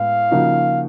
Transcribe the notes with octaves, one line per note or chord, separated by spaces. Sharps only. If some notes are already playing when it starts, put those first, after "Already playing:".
Already playing: A2 G#3 B3 F5
C#3 F3 A#3 D#4 F#4